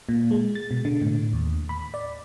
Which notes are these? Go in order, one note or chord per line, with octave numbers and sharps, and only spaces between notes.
A#2
G#3
A6
B2
D3
A2
D#2
B5
D5